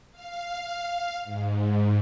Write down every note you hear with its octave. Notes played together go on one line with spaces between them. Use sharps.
F5
G#2